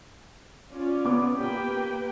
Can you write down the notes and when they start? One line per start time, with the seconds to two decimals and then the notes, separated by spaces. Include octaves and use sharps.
0.72 C#4 F4 D5
1.05 B3 D6
1.38 A#3 G4 B4 G5